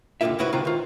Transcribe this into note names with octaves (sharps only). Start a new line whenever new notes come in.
C#2 G2 D3 A#3 F4 E5
C#2 G#2 C#3 E4 F#4 B4
C#2 D#3 E3 C4 F4 A#5
D#3 F4